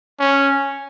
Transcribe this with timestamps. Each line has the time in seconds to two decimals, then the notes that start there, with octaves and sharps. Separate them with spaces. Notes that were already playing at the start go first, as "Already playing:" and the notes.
0.20 C#4